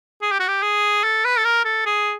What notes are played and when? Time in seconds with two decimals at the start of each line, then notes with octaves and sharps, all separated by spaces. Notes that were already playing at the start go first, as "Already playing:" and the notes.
0.22 G#4
0.31 G4
0.40 F#4
0.48 G4
0.63 G#4
1.04 A4
1.25 B4
1.38 A4
1.45 A#4
1.65 A4
1.86 G#4